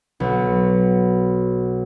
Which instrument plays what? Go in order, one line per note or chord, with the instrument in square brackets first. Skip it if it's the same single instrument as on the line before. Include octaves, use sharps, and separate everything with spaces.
[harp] B1 F#4